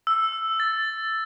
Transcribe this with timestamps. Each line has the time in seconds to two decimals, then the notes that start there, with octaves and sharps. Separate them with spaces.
0.07 E6
0.60 A6